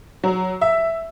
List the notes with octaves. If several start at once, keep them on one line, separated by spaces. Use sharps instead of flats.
F#3
E5